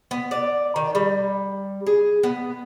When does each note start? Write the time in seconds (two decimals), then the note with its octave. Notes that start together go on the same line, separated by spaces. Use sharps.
0.11 B3
0.31 D5
0.76 D#3
0.95 G3
1.87 G#4
2.23 B3